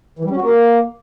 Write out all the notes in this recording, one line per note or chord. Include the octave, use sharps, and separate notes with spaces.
E3
G3
C#4
F#4
A#3